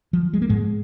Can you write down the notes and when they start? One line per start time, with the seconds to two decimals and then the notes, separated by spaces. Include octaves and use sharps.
0.13 F3
0.33 G#3
0.42 A#3
0.49 G#2 G#3